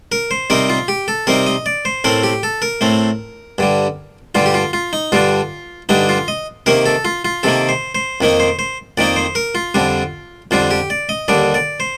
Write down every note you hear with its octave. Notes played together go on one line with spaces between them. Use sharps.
A#4
C5
C3 G3 C4 D#4 A#4
F4
G4
A4
C3 G3 C4 D#4 A#4
D#5
D5
C5
A2 A3 C4 A#4
G4
A4
A#4
A2 A3 C4
G2 D3 G3
G2 D3 G3 F4
G4
F4
F4
D#4
G2 D3 G3 D4 F4
G2 D3 G3 D4 D#4
F4
D#5
C3 D#3 A#3 A#4
A4
F4
F4
C3 D#3 A#3 A4
C5
C5
F2 D#3 A#3 D#4
C5
C5
F2 D#3 A#3 D#4 D5
C5
A#4
F4
F2 D3 G3 D4
F2 D3 G3 D4 F4
G4
D5
D#5
D#2 D3 G3 D4 D5
D5
C5